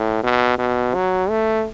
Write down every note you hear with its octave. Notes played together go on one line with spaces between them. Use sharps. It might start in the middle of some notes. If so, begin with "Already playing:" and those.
Already playing: A2
B2
B2
F#3
A3